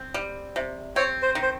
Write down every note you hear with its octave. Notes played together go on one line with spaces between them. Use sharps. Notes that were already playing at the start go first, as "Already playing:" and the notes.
Already playing: C4
G3
C3
C4 C#5
C5
D#3
C5